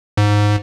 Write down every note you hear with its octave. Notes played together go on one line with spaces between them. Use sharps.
G#2